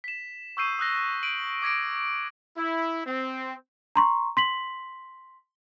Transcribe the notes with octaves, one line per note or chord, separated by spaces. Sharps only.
B6 E7
C#6 D#6 E6 G6 C7 D#7
D#6 E6 F#6 A#6 G7
D7 D#7 F#7
D6 G#6 A#6 D7
E4
C4
A#5 C6 C#6
C6 B6 F#7